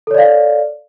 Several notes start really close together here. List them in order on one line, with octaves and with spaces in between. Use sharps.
A4 C#5 D5 F5